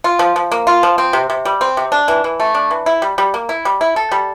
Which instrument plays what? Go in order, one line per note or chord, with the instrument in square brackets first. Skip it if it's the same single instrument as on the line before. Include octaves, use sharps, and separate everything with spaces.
[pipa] F4
F3
F3
A#3
F4
F3
C4
C3
C3
G3
C4
C3
D4
E3
E3
A3
D4
E3
E4
G3
G3
A#3
E4
G3
E4
A4
G3